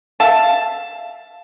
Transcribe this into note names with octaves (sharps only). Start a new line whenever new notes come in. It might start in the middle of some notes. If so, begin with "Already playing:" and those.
E5 F5 A5